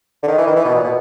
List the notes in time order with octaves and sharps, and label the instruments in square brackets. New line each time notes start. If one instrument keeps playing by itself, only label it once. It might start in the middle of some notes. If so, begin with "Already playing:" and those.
[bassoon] D3
D#3
E3
D#3
E3
B2
A#2
B2